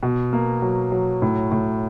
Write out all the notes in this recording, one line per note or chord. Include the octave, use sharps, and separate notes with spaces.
B2
A#3
F#3
F#3
A2
A2